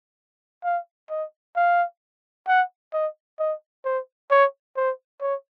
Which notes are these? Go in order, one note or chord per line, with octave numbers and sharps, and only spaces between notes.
F5
D#5
F5
F#5
D#5
D#5
C5
C#5
C5
C#5